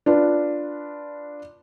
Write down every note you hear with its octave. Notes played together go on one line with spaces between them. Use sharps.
D4 F4 B4